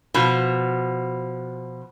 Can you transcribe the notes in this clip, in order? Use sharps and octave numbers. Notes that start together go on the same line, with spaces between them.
B2 F3